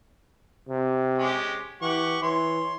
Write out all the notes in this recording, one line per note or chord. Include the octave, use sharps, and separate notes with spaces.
C3
G#3 C#4 G4
E3 G4 F#5 C#6
E3 C#5 C6